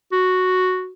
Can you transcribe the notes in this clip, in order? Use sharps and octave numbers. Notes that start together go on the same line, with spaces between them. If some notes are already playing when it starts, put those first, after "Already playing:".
F#4